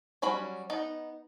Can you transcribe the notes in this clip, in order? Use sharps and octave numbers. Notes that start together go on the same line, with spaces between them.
F#3 G3 C#4 B5
B3 D#4